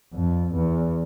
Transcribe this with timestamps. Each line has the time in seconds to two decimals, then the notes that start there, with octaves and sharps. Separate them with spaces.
0.14 F2
0.54 E2